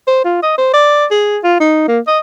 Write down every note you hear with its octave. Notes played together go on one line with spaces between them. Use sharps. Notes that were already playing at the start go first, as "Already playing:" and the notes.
C5
F4
D#5
C5
D5
G#4
F4
D#4
A#3
D#5